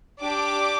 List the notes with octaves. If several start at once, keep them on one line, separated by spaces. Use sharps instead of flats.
D4 G4 D6